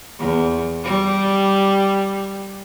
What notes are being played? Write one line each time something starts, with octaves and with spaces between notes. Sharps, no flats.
E2
G3